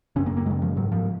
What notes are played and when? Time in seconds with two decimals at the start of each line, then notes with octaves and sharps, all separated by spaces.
0.16 F#2 C#3 C#4
0.26 A#3
0.37 A#3
0.46 F#2 G#3
0.50 C#3
0.62 F3
0.76 G#2 F#3
0.92 F3